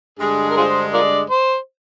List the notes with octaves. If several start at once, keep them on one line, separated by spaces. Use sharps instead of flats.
G2 D3 G#3 G#4
A#4
F4 G#4 C5
F4 A#4 D5
C5